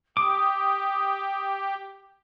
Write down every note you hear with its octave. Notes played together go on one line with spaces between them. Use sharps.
G4 D6 D#6